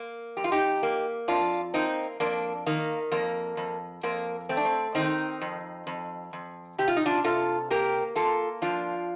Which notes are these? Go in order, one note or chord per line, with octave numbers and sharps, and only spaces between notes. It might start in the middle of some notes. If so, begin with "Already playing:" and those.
Already playing: A#3
F2 G4
F4
D#4 G4
A#3
F2 D4 F4
A#3 C4 D#4
F2 A#3 D4
D#3 A#3
F2 A#3
F2
F2 A#3
A3 C4
D4
C4
D#3 C4 D#4
F2
F2
F2
C3 G4
F4
D#4
D4 F4
C3 F4 A4
A#3 G4 A#4
A#3 F4 A4
F3 D4 F4